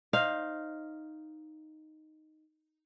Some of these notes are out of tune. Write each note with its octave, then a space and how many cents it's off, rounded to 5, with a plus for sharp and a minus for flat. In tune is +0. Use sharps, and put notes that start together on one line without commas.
D#4 +0 C5 +25 F5 +0